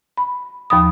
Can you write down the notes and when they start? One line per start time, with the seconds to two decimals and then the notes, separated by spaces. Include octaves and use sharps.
0.17 B5
0.70 D#2 F3 B5 D#6